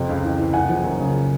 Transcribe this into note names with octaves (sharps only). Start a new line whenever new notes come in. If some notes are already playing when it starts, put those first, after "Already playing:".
Already playing: F2 C3 G5
C#2
E3
E3
F#1 F#5 G#5
F3
F#2
C#3